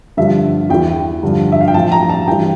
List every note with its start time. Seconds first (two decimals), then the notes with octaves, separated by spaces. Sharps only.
0.17 G2 D3 F3 E5
0.69 E2 E3 G5
1.23 G2 D3 F3
1.52 E5
1.61 F5
1.68 G5
1.74 A2 F3 A5
1.92 A#5
2.09 A5
2.27 G2 E3 G5